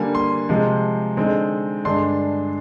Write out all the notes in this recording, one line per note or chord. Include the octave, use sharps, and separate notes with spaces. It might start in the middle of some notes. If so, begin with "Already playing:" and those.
Already playing: D3 G3 A#3 G#5
C6
C3 F3 G#3
D3 G#3 C4 D#4
G2 D3 G#3 D4 C6